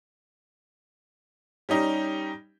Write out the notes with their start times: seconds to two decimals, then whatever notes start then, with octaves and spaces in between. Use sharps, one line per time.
1.69 G3 C#4 D#4 G4